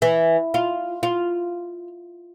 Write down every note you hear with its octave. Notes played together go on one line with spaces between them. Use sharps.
E3
F4
F4